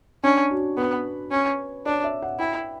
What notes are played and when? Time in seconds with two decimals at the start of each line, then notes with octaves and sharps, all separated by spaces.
0.24 C#4 D4
0.51 F#4
0.77 B3 B4
1.31 C#4
1.86 D4 C#5
2.04 E5
2.22 F#5
2.39 E4 G5